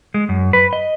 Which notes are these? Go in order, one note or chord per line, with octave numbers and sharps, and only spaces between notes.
G#3
F#2
B4
D#5